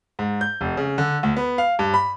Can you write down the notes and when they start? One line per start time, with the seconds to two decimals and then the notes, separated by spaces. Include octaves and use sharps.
0.19 G#2
0.41 G6
0.61 F1
0.77 C#3
0.98 D3
1.23 D2
1.37 B3
1.58 F5
1.79 G2
1.94 B5